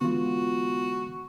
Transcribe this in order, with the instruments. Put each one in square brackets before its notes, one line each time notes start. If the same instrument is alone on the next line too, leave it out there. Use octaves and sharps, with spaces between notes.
[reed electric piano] D3 E3 G#3 [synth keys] B3 F4 [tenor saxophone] F#4